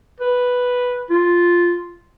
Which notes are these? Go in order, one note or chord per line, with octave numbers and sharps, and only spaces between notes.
B4
F4